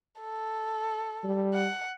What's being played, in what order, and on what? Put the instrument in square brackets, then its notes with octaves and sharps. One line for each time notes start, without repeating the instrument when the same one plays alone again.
[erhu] A4
[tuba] G3
[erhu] F#5